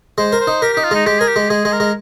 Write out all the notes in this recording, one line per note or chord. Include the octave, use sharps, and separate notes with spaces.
G#3 C5
A#4
C5
D#4
G4 A#4
D#4 G4
F4
G#3 D#4
G#3 G4
G#4 A#4
G4
G#3
G#3 G#4
G#3
A#4
G#3